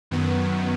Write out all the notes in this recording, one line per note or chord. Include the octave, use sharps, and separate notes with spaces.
F#2 D#3 F#3 B3